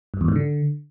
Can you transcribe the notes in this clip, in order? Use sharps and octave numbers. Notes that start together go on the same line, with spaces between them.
G2
E2
G#2
D3